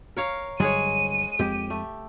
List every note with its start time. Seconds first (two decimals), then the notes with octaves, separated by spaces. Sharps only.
0.17 A#4 C#5 F5
0.60 G2 D3 F#3 G#3 G#4 C#5 D#7
1.39 F2 G#3 C4 G4
1.70 A3